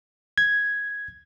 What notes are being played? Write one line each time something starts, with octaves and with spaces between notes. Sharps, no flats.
G#6